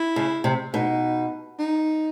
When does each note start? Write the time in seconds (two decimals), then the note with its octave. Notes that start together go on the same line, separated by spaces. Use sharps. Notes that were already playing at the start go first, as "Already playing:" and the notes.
Already playing: E4
0.16 C#3
0.44 C3
0.74 B2 D#4
1.59 D#4